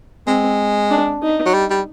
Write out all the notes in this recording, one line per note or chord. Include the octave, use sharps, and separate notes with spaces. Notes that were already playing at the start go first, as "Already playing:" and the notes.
G#3 C4
D4
D#4
F#3
G3
G3